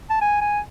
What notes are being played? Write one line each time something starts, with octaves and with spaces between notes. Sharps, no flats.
A5
G#5
G#5